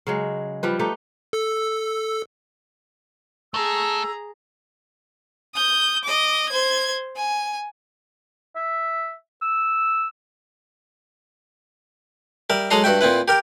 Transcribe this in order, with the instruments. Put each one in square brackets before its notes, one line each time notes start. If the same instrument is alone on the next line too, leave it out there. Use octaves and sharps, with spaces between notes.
[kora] C#3 F#3 G#3
F3 G3 B4
A3 D#4 G4 B4
[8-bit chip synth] A4 E6
[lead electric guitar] A3 A4 [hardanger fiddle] G#4 A#5 [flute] E6
[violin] D#6 G6
D#5 D6
C5 G#6
G#5
[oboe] E5
E6
[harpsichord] G3 A#4 E5
F#3 G#3 A4 D#5 A#5 C6
G2 F#4 E5 G5
A#2 C4 E4 B4
G4 A#4 G5